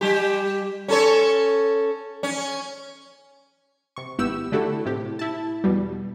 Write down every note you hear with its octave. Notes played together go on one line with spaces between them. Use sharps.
G3 G4
C#4 A4 C#5
C#4
C3 C#6
G#1 B3 E4 G4 E6
D3 A3 E4 F#4 G4 A4
A2 C3 G4
E4 A5
E2 B2 G3